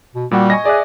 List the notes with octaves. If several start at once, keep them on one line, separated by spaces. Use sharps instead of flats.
B2
A#2 G3 F#4 F#5
D#5 G#5 C#6 A#6
G#4 D5 E5 F#6